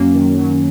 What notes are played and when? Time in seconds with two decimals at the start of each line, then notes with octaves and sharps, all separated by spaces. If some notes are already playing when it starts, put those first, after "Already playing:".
Already playing: F#2 F#3 A#3 C#4
0.14 D#3
0.36 F#3